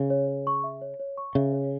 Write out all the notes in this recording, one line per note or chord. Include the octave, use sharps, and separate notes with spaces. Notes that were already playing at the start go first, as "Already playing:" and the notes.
Already playing: C#3
C#5
C#5
C#6
E5
C#5
C#5
C#6
C#3 E5
C#5